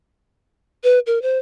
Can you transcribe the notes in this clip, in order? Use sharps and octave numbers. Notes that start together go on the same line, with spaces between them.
B4
A#4
C5